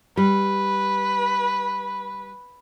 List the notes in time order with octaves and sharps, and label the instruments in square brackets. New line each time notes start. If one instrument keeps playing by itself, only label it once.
[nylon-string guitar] G3 [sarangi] B4